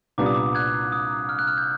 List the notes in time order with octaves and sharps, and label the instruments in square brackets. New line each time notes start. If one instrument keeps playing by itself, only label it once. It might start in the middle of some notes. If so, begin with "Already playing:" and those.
[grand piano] C2 A#2 G3 B3 D4 [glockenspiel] D6
[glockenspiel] D#6
D6
F#6 G#6
D#6
F6
F#6
F6
G6